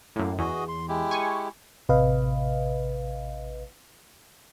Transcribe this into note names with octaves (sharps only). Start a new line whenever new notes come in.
F#2 A2 A#3
E2 F#4 G#4 D#5
C6
G#3 E4 G4
G#5 C#6
A1 C3 B4 D#5 F5